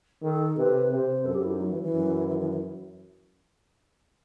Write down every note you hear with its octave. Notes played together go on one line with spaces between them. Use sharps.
D#3 A4
C3 B4
C3 C5
F#2 A4
G4
E4
D#4
F#3
E3
E3
F#2
E3
E3
E3